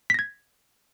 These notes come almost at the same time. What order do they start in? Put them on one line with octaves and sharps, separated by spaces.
B6 A#6 G#6